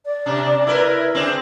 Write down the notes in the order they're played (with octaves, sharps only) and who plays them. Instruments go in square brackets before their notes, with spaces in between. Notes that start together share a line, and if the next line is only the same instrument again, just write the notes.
[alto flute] D5
[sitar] C3 D4
E4 A#4 B4
C4 D4 G#4